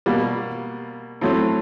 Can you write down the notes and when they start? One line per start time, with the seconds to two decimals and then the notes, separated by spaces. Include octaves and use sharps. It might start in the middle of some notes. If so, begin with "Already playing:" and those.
0.06 B2 G3 A#3
1.21 A2 F#3 A3 C4